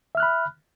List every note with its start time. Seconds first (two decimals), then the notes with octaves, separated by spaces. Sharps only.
0.15 E5
0.17 F6
0.20 F#6
0.23 B5